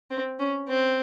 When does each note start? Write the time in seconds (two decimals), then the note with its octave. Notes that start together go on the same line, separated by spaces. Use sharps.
0.11 C4
0.39 C#4
0.68 C4